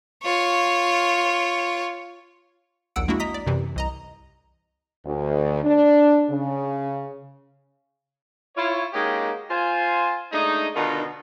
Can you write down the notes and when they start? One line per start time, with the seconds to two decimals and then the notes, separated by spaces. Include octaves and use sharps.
0.23 F4 C#5
2.96 A#1 D#2 F#5 E6 D7
3.08 G#3 A#3 D4 E4 F#4
3.20 D#5 A#5 D#6 B6
3.34 D5
3.46 F#2 C3 E3
3.76 C2 D#5 A#5
5.04 D2
5.63 D4
6.29 C#3
8.56 E4 F4 C#5
8.93 G#3 A#3 C#4 D#4 F#4 G4
9.49 F4 C5 G#5
10.32 G#3 A3 D4 D#4
10.75 B2 D3 D#3 D4 D#4 F4